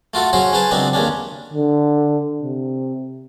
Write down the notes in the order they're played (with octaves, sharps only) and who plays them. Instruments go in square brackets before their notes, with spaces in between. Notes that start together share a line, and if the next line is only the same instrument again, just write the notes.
[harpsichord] A3 F4 F#4 A4
F#3 C#4 F#4 G#4 C5
C#4 G#4 B4 C5 A5
C#2 F#2 B3 C4 D4 D#4
D#2 C#3 C#4 D4
[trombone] D3
C3